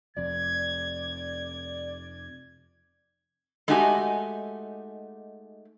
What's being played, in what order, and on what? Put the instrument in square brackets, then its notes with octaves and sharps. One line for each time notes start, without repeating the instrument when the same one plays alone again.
[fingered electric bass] F1 F2 [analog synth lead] D5 [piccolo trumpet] G#6
[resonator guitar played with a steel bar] G#3 A3 D#4 F#4 G4 G#5